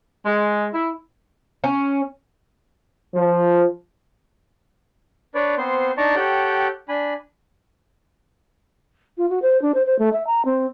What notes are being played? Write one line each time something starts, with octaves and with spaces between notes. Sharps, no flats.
G#3
E4
C#4
F3
D4 B4 C#5 D5
B3 C4 C5 C6
D4 D#4 D5 A5 A#5 C#6
G4 A4 C#5 F#5 G5 G6
D4 G#5 B5
F4
F#4
C5
D4
C5
C5
A3
E5
A#5
C4